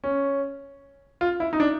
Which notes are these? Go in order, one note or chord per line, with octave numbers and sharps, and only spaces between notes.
C#4
F4
E4
D#4
D4